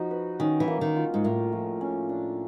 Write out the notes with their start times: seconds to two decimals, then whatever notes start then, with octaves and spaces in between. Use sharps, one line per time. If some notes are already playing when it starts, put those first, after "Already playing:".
Already playing: F3 D#4 F#4
0.11 B4
0.40 D#3 C#4
0.60 E3
0.68 A#3
0.81 D#3
0.96 F4
1.14 G#2
1.24 A2 A#3
1.53 F3
1.81 C#4
2.09 D4